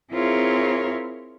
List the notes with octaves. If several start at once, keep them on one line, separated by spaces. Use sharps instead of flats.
C4 E4 F4 G#4 A#4 C#5